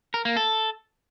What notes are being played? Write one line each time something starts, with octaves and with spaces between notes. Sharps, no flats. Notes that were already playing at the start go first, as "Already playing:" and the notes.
A#4
A#3
A4